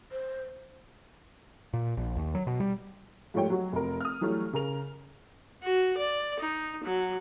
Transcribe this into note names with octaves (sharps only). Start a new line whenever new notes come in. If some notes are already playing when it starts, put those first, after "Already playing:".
C5
A#2
A#1
D#2
F#3
B2
G3
G#2 F3 G3 A3 C#5 G5
F#3 F#4
F1 A#4
D#6 F6
E3 F#3 G3 A3
C#3 A#4 F7
F#4
D5
D#4
F#3